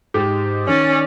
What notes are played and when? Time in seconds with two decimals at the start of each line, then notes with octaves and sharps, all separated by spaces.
0.14 G#2 G4
0.67 D#3 C#4 D5